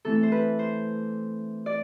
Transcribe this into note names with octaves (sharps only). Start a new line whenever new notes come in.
E3 A3 C4 A4
C5
B4
C5
D5